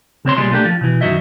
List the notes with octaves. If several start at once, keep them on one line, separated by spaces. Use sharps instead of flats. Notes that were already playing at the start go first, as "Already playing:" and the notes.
C#3 C4 C#5 C6
B1 A#2 G3 G#3 C6
A3 A#3 D4 G4
F3
B2 E3
F#2 D#3 F#3 F#4 D#5 E5